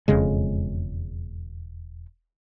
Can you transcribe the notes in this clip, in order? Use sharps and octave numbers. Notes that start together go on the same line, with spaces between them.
E1 F2 C#3 G#3